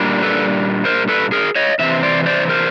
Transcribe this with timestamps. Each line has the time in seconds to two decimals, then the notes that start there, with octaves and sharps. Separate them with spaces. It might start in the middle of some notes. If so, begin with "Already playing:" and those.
Already playing: A#2 G3 A#3 D4
0.23 A4 B4
0.85 A#4 C5
1.09 A4 B4
1.32 G#4 A#4
1.56 C#5 D#5
1.79 C3 E3 C4 E5
2.03 C5 D5
2.26 C5 D5
2.49 A#4 C5